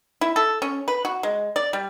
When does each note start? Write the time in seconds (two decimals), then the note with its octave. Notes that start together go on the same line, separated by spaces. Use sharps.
0.21 E4
0.36 A4
0.62 C#4
0.88 B4
1.05 F#4
1.23 G#3
1.56 D5
1.73 G3